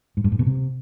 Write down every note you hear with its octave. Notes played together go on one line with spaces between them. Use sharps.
G#2
G2
G#2
B2
C3